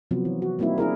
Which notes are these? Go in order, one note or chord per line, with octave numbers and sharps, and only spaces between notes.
C3 F3 F#3 B3
E3
F#4
G3 A#3 C4 D#4 E4
D4 E4 G#4 A#4